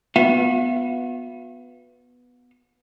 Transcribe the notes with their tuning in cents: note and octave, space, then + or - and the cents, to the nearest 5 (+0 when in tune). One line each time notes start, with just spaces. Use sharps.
B3 +0 F#4 -40 E5 +40